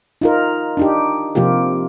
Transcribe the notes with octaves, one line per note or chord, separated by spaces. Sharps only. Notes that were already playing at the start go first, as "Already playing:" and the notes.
D#4 F4 A#4
D4 D#4 G4
C3 F3 A#3 F4 G4